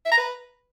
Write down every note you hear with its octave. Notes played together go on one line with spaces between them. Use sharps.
E5
A#5
B4